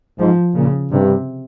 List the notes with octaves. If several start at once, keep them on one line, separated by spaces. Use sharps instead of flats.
G#2 F3
A#2 C#3
G2 C3